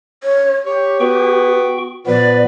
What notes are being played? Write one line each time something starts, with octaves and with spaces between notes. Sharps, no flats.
C#5
G4 C#5
B3 F#4 G5 C#6
A#2 F3 B3 B4 D5